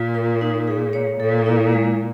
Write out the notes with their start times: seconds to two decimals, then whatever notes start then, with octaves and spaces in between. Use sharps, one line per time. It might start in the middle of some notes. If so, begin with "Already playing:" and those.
Already playing: A#2 F4
0.14 A#4
0.41 D#4
0.67 G#4
0.93 C#5
1.20 A#2 A4
1.46 E4
1.72 G#3